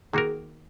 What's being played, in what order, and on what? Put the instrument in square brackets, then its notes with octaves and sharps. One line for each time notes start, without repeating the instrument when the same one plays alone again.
[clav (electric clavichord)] D#3 A#3 F#4 A#4 [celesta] G#4